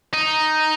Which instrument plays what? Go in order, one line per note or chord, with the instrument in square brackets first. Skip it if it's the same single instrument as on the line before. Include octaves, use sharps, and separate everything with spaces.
[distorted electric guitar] D#4